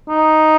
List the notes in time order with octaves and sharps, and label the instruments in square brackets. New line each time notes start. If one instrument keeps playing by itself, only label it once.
[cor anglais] D#4